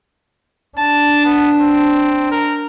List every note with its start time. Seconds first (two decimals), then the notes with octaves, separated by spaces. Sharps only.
0.78 D4 A5
1.25 B3
1.61 C4
2.31 A#4